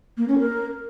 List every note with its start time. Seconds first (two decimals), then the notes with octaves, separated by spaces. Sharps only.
0.17 A#3
0.28 C#4
0.39 A#4